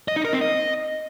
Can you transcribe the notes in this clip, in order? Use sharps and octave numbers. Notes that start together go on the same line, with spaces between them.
D#5
D#4
A#4
C4
D#5